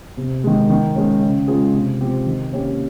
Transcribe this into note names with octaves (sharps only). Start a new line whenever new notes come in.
C3
D#3 G#3
D#3
G#3 C#4
C#3
G#3 C#4 F4 G#4
C3
F3 C4 G4
D#3
A#3 C#4 G4